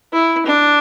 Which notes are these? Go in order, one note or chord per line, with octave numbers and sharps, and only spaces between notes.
E4
D4